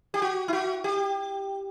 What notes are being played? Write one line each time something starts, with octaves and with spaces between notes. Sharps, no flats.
G4
F#4
E4
F#4
G4